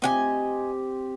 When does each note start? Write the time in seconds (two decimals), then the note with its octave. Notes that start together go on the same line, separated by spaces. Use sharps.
0.02 C4 G4 D#5 F#5 G#5